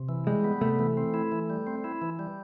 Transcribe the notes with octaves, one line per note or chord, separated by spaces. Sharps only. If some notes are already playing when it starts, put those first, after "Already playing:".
Already playing: C3
E3
G3 G#3
B3
C3 A3
E3
C4
E4
E3
G3
C4
E4
E3
G3